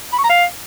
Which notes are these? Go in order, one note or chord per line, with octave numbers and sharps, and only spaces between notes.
B5
C#6
A#5
F5